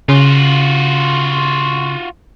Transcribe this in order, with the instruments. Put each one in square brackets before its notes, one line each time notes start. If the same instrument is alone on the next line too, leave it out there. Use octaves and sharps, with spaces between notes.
[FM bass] C#3 [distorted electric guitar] F4 F#4